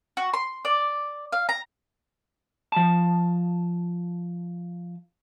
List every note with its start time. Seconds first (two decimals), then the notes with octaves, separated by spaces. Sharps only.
0.17 F#4
0.34 C6
0.65 D5
1.33 F5
1.49 A#5
2.72 F3 A5